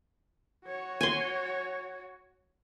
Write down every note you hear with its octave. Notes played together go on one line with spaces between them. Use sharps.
F#4 C#5
G#5 C6